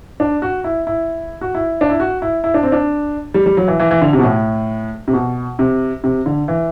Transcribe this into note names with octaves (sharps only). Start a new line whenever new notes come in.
D4
F#4
E4
E4
F#4
E4
D4
E4
F#4
E4
E4
D4
C4
D4
G3
G3
F#3
E3
E3
E3
D3
C3
B2
A2
C3
B2
C3
C3
D3
E3